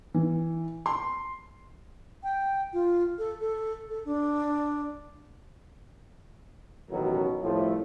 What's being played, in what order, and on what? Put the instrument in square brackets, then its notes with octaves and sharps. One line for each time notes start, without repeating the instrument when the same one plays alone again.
[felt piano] E3
C6
[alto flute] G5
F4
A4
A4
A4
D4
[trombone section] A1 F#2 B2 D#3 F#3 A#4
C2 A2 F3 A3